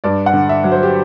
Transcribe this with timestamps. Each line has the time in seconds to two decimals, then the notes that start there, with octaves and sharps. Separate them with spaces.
0.04 G2 D5
0.26 F#5
0.33 D3
0.49 E5
0.64 F#3
0.72 C5
0.83 G4